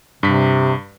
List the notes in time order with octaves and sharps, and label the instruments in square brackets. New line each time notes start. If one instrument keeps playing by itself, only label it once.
[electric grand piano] G2 G3 B6 [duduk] C3